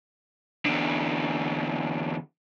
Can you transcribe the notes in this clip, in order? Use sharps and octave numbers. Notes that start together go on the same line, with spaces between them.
E2 D3